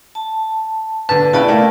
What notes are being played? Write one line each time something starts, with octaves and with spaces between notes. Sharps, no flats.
A5
D3 B4 A5
C#3 E4 B4 D5 G5 A5
A3 A#3 E4